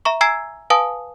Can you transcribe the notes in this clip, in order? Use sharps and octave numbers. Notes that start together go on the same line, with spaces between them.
E5 A#5 C#6
G#5 A#5 E6 G#6 C7
B4 F5 G#5 A5 D#6